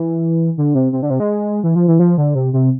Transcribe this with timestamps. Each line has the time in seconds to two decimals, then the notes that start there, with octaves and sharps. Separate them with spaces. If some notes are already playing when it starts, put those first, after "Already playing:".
Already playing: E3
0.58 D3
0.75 C3
0.92 C3
1.03 D3
1.10 C3
1.20 G#3
1.64 E3
1.76 F3
1.88 E3
1.99 F3
2.18 D3
2.35 C3
2.53 C3